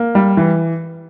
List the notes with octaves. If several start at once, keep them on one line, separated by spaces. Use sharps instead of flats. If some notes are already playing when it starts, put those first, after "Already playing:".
Already playing: A#3
G3
E3